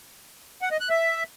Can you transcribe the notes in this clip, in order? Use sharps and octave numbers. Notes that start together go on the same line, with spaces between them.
F#5
D#5
F#6
E5